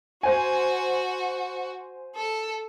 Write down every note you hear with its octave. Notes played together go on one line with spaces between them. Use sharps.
F#4 C5 G#5
A4